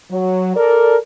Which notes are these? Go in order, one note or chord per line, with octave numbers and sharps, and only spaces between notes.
F#3
A4 A#4 D5